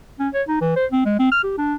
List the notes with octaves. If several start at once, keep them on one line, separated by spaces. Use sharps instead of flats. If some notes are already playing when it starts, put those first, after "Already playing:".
C#4
C#5
D#4
E3
C5
C4
G#3
C4
F6
G4
D4